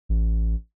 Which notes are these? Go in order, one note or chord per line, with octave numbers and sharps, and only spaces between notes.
A1